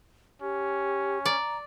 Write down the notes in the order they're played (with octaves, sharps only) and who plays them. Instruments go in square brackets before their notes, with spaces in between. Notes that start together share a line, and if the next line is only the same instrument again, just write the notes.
[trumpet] C#4 [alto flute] G4
[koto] D5 [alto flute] A#5